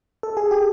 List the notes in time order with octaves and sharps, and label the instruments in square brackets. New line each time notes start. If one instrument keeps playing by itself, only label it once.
[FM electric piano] A4
G#4
G4